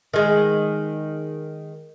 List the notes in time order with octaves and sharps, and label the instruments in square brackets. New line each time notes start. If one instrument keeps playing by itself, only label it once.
[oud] D#3 G#3